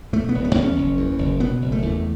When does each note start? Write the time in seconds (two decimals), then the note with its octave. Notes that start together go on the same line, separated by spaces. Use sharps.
0.13 B2 A3
0.29 B3
0.35 E1
0.44 B3
0.55 E2 B3
0.61 C#4
0.76 F#1
0.97 E2
1.19 F#1
1.40 B2 B3
1.62 F#1
1.72 A3
1.82 E2